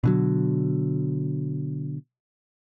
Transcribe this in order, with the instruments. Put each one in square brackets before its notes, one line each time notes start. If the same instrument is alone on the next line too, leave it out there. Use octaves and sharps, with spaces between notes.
[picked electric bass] B2 D3 F#3